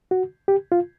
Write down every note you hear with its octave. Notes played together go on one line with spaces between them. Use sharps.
F#4
G4
F4